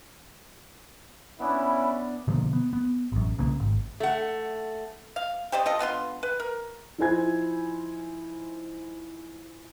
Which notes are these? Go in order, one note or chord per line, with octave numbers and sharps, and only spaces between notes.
B3 C#4 D4 E4 B5
B2 D3 F3 A#3
B3
B3
A1 F#2
C2 C#3 A#3
G#1
A3 F#5
F5
G4 C5 D5 D#5
F4 A4 D#5
D3 B3 F4 C6
B4
A#4
F3 D#4 E4 C5 G#5 G#6